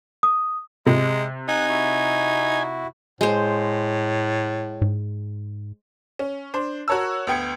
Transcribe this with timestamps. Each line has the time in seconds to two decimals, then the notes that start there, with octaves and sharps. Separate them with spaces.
0.23 D#6
0.86 C3 G#3
1.49 D#4 F#5 G#5 F#6
1.69 E4 F#4
3.21 A2 G#3 C5
4.82 G#2
6.19 C#4
6.54 D4 C5
6.88 F#4 A#4 C#5 A5 E6
7.27 D2 B3 G5 G#6 C#7